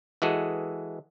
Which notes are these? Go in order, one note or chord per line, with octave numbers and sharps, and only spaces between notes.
E3 G#3 F#4 G#4 A4